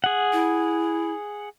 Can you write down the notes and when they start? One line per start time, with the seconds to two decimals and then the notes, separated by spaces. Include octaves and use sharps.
0.04 G#4 F#5
0.33 E4